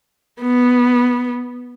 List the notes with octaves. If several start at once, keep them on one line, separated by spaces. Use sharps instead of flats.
B3